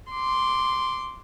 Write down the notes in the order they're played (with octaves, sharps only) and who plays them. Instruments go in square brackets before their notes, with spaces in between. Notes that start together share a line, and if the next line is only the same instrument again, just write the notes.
[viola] C6 D6